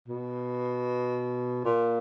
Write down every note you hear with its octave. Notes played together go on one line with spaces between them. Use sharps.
B2
A#2